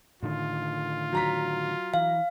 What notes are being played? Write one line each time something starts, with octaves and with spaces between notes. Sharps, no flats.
A2 D3 D#3 F4
F#3 A#5 B6
E3 F5